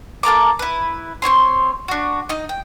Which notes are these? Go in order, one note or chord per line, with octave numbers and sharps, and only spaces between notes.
A#3 A4 A#5 D6
E4 B4
C4 D#4 C#5 C6
D4 F#4
D#4 D#5
G5